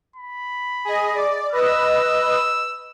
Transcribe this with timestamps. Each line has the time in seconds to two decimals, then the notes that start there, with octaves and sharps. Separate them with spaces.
0.16 B5
0.85 G#4 D#5
1.15 D5
1.52 B4 D#5 E6